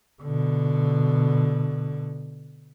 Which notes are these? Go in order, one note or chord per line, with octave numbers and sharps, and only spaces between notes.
B2 D3